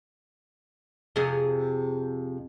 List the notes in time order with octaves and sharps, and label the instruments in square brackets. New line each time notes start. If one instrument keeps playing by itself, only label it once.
[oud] F2 C3 G#4